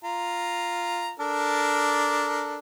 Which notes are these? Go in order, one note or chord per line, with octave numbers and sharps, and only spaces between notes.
F4 A#5
D4 A4 A#4